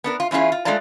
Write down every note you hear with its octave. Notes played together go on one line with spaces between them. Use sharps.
B3 D4 A#4
F4
E2 C#4 E4 F4 G#4
F4
G#3 A3 D4 F4 D5 A#5